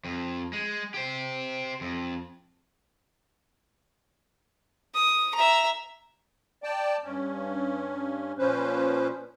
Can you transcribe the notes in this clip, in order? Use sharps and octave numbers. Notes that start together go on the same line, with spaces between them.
F2
G#3
G4 C5
F2
D#6
E5 A#5
D5 G5 A5
G2 C#4
A#2 F3 C#4 B4 C5